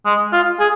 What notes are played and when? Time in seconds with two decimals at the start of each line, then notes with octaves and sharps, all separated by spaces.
0.06 G#3
0.33 F4
0.60 G#4